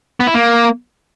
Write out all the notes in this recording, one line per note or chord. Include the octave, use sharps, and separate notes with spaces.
B3
E4
A#3